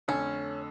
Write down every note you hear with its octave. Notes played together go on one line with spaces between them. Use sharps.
F2 D3 A3 C#4